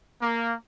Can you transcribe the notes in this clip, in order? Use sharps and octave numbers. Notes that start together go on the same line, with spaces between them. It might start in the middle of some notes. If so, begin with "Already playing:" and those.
A#3